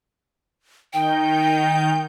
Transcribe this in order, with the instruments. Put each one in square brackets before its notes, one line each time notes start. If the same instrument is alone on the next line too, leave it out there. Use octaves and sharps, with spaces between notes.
[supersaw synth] D#3 D#4 G6 [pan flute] G5